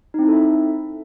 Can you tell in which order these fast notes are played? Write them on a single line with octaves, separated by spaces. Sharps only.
D#4 C4 E4 A4 E5